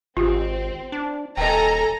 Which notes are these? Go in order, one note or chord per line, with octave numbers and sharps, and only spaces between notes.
G#1 C4 F4 G4
D4
D#1 A4 D#5 G5 G#5 A#5